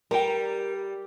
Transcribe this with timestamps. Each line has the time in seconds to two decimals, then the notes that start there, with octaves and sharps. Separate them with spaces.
0.11 G3 A#4 G5 A#5